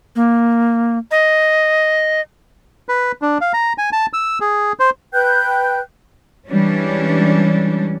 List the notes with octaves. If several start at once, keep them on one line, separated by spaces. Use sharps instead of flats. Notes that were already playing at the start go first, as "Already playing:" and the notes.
A#3
D#5
B4
D4
F5
A#5
G#5
A5
E6
G#4
C5
B4 G5 F#6 G6
E3 G3 G#3 C#4 D4